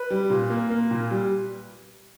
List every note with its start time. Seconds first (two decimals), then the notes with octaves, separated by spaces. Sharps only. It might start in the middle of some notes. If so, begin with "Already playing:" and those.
Already playing: B4
0.10 G3
0.30 A#2
0.50 A#3
0.70 A#3
0.91 A#2
1.11 G3